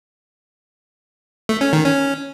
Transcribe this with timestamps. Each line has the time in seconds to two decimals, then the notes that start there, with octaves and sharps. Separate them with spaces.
1.49 A3
1.61 C#4
1.73 D#3
1.85 C#4